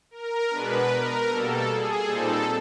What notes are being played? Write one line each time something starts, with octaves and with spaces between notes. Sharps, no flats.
A#4
B2 G#3 B3 D4 B4
A#4
B2 G3 A#3 A4
G#4
A#2 G3 C4 D#4 A4